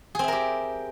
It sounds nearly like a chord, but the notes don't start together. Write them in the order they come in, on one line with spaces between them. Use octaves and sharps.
G#4 C4 E5 A#4 G4